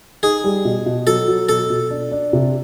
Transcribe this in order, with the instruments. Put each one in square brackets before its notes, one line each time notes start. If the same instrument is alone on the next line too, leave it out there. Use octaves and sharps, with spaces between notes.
[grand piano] D#4 [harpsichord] G#4
[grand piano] G3
B2
B2
[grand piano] F#3 [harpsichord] A4
[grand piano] F#3
[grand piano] B2 [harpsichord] A4
[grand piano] B2
D4
D4
C3